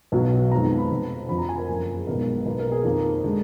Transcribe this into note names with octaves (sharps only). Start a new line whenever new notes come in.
B1 B2 F#3
F2 D#3 G#3 B3 A#5
B5
F1 F2 F3
F2 D3 F3 B5
A#5
G#5
A#4
F#2 F3 A#3
G#4
B1 B2 G#3 B3 A#4
B1 B2 A#3 B4
A#4
G#4
F2 D#3 A#3 A#4
D3 G#3